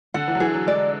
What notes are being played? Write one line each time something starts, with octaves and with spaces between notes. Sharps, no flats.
D3 F#5
E3
F#3
E3 G#4
F#3
G#3 D5